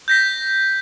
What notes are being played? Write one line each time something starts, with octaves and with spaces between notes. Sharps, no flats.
G6 A#6 B6